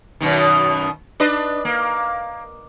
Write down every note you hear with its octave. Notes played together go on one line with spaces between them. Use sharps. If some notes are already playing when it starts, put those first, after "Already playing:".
F#2 B2 D#3
D4 B4 D#5
A#3